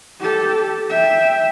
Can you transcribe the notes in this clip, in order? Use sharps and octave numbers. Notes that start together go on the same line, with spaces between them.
G4 A4
E5 G5